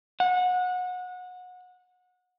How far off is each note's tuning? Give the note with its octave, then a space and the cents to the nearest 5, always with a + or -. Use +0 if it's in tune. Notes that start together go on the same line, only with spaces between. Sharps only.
F#5 -25